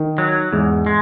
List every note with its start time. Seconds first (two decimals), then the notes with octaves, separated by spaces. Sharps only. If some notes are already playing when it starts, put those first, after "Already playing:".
Already playing: D#3
0.18 F#3
0.52 E2 G#2
0.86 G#3